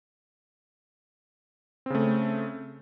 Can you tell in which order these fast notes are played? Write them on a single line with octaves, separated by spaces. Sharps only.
C4 C#3 A3